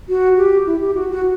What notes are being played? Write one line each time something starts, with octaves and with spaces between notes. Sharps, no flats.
F#4
G4
E4
G4
F#4
F#4